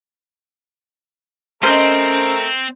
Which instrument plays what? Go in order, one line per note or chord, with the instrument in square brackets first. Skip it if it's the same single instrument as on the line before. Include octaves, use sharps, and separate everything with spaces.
[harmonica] A3 A#4 [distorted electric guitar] C4 [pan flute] C#4 [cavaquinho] C5 D#5